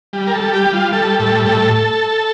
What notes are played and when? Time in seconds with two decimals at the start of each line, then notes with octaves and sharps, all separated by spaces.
0.13 G3
0.27 A#4
0.33 A4
0.40 G3
0.53 G4
0.67 G3
0.73 F4
0.92 G3 A4
1.19 A2 A4
1.46 A2 A4